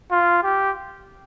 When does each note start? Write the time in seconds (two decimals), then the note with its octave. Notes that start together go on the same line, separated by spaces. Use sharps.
0.12 F4
0.44 G4